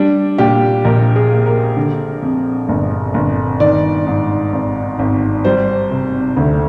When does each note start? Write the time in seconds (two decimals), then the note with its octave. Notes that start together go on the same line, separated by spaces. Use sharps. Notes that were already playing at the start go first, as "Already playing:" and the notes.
Already playing: G3 D4
0.38 A#2 G4
0.85 A#1 A#4
1.16 G#4
1.31 A#3
1.46 A#4
1.77 D3
2.23 F2
2.69 G1
3.14 G1
3.60 D#3 D5
4.07 G#2
4.53 G#1
4.99 G#1
5.45 G3 C5
5.91 C3
6.36 D2